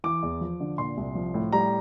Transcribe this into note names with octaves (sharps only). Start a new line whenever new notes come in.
E3 D6
E2
F3
D3
A#2 C6
C2
F3
A2
G3 A#5